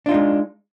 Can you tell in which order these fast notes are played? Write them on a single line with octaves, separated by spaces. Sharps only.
D4 F4 D#4 G#3